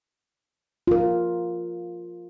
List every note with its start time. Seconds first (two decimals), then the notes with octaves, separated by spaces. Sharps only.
0.87 F4 A#4